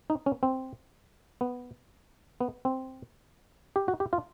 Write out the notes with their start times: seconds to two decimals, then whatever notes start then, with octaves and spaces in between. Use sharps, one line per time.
0.10 D#4
0.26 C#4
0.43 C4
1.41 B3
2.40 B3
2.65 C4
3.76 G4
3.88 F#4
4.00 G4
4.13 F4